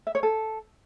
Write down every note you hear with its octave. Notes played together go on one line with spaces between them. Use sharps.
E5
C#5
A4